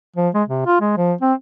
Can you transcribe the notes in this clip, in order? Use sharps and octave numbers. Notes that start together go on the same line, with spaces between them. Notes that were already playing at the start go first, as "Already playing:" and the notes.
F3
G#3
C3
F4
G#3
F3
C4